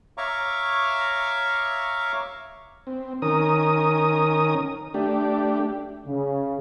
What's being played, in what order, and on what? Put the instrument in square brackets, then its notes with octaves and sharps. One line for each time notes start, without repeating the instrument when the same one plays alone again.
[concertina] C#5 E5 F5 A#5 C#6 D6
[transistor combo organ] C4
D#3 C#4 A#4 D#6
A3 D4 G4
[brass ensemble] C#3